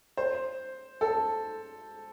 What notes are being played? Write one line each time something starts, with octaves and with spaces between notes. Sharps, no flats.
C5
A4